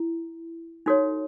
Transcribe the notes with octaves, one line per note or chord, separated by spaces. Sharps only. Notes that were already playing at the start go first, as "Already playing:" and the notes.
Already playing: E4
D#4 F#4 A4 C#5